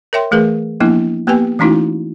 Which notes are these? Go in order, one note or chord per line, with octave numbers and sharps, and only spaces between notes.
A#4 C#5 E5 G5 C6
E3 A3 G#4 A#4 B4
F3 A#3 B3 D4 E4
A#3 B3 G4 B4 G5 G#5
E3 A3 C#4 D#4 E4 F#4